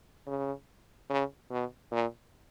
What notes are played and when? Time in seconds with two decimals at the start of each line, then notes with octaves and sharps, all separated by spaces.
0.27 C#3
1.10 C#3
1.51 B2
1.92 A#2